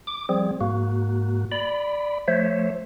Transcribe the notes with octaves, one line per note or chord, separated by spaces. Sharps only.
D6
F3 G3 C4 G#4
G#2 A#3 F#4
D5 B5
F3 A3 C5 C#5 E5